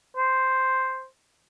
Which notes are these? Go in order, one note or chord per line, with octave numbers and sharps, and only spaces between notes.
C5